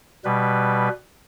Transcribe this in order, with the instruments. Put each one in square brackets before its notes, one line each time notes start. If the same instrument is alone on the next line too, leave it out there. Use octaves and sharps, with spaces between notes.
[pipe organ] B2 G3 B4